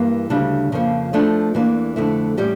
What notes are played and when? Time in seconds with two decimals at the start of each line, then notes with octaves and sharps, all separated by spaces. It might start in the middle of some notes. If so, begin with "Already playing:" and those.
Already playing: G2 E3 A#3
0.30 D2 C#3 G3 D4
0.72 F2 C#3 F3 A#3 C#4
1.13 F3 A3 D4
1.54 E2 E3 A#3 D4
1.96 F2 D3 A3 E4
2.37 A2 E3 G3 C#4 G4